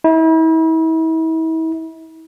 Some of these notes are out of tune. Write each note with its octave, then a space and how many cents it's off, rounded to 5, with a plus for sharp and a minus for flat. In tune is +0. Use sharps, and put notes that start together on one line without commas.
E4 -40